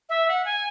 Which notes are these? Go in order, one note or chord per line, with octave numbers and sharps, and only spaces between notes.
E5
F#5
G#5